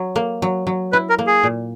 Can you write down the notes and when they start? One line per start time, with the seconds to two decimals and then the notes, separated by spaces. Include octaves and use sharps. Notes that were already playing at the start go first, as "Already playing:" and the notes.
Already playing: F#3
0.16 A#3
0.42 F#3
0.67 F#3
0.92 E4 B4
1.09 A#4
1.19 A#3
1.27 G#4
1.43 A#2